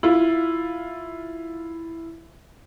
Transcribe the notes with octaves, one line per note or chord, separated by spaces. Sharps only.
E4 F4